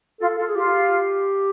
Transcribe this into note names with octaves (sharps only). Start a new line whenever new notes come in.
F4 A4
F4 A4
G#4
F4 G4